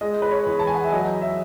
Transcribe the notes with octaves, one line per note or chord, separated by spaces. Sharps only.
G#3 D#5
B4
C#5
E2
A5
G#5
F#5
E5
F#3 D#5
E5